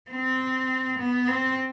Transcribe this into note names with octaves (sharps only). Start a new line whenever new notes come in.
C4
B3
C4